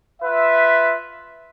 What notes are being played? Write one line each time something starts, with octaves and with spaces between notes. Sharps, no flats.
F4 B4 E5